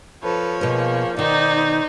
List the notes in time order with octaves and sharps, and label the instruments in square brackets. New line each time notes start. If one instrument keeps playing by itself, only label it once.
[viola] F3 C#5 [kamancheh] A4 B4
[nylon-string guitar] B2 B4 [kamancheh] A#3 G#4
[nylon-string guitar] B2 D#3 [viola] D#4 C5 [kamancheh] D5 A#5